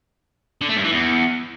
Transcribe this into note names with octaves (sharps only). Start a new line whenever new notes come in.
D3
A3
G2
E3
E2